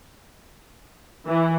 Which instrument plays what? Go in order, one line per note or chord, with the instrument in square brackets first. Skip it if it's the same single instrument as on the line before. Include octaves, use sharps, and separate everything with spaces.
[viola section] E3